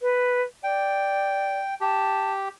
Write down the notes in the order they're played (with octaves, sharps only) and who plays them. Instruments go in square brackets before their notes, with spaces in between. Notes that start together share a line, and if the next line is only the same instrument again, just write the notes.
[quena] B4
[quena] D5 [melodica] G5
[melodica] G4 [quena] A5